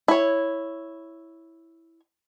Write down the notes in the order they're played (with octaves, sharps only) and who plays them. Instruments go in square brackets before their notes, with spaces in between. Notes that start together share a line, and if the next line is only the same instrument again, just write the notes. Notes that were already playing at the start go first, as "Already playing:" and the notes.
[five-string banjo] E4 C#5